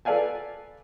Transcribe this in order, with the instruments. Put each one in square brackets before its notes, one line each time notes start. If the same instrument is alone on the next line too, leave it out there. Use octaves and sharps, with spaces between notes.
[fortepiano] A4 B4 D5 F5 G#5 A5